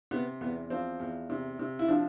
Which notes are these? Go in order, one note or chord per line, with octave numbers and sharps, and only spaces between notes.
C3 B3
E2 B3
F3 C4
E2
C3
C3
E4
F3 D4